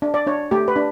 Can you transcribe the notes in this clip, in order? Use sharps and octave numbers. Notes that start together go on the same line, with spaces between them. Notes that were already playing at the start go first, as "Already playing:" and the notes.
D4
D5
D4 C#5
A3 G4
B4
D4